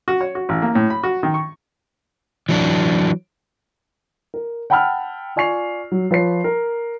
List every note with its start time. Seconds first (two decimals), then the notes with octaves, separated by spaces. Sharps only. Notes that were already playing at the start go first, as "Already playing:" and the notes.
0.08 F#4
0.21 C#5
0.35 F#4
0.49 A1
0.62 A#3
0.75 A2
0.90 B5
1.03 F#4
1.23 D#3
1.34 C#6
2.49 E3 F#3 D4
4.34 A#4
4.70 F#5 G5 A5 B5 E6 F6
5.36 F4 D5 G#5 C#6 C7 F7
5.92 F#3
6.11 F3 B4 C#5 C7
6.44 A#4